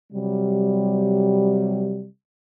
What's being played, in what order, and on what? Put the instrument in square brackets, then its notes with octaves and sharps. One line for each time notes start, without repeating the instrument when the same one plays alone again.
[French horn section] C3 F#3 G3